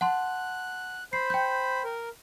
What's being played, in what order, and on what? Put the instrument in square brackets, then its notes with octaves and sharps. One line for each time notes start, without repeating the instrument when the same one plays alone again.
[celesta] F#5 A5 C6 [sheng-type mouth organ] F#6
[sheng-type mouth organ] C5 B5 [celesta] C7
[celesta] G5 G6
[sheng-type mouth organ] A#4